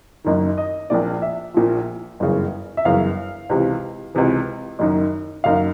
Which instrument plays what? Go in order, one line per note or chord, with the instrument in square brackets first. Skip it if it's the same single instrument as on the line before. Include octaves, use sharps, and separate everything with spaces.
[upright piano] F#1 F#2 D#3
D#5
A#1 A#2 F3 D5
E5
A#1 A#2 F3
G1 F#2 C#3 E3
E5
G1 F#2 C#3 E3 F5
C#2 C3 E3
C#2 C3 E3
F#1 F#2 D#3
F#1 F#2 D#3 F5